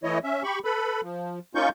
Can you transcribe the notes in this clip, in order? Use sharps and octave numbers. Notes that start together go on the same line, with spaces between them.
E3 A3 E4 C#5 D#5
C#4 E5
G4 B5 C#6
A4 B4 B5
F3
A#3 C#4 D#4 F4 C#6 G6